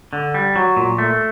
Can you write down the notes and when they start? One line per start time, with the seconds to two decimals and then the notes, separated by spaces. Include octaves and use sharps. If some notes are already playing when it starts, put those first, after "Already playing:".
0.13 D3
0.34 G3
0.56 F#3
0.77 A#2
0.98 A3